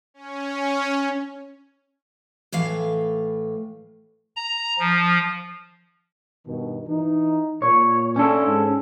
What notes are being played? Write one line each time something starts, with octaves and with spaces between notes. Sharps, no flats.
C#4
A2 E3 A3 F5
A#5
F3
G2 B2 D#3
E3 D#4
A#2 C#5
C#4 D4 A4
G#2